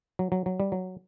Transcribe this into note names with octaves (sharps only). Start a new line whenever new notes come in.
F#3
F#3
F#3
G3
F#3